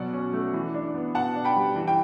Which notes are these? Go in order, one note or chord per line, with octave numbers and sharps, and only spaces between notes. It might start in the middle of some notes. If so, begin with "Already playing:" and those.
Already playing: B2 F#3 D5 F#5
C#4
A3
E3
D4
B3
B2 F#5 A5
D4
G5 B5
G3
E3
G5